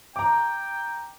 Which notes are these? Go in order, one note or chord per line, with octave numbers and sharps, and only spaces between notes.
G5 A#5 D6